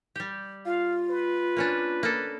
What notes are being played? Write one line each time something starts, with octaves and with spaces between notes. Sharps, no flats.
G3 G4
F4 F5
B4
A#3 C#4 D4
A#3 A4